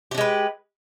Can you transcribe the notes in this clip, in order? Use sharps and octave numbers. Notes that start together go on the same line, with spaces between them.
G#3 D4 G4 B4